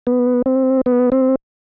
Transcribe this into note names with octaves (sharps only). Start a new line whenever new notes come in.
B3
C4
B3
C4